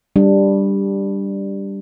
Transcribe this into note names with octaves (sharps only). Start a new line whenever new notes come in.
G3 D4